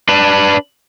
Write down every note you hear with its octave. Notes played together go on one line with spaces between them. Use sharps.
D4 B4